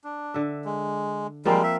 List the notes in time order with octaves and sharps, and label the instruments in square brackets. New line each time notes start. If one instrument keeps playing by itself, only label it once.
[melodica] D4
[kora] D3 E5
[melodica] G#3
[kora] F3 A#3 C4 [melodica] G3 G#3
[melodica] E5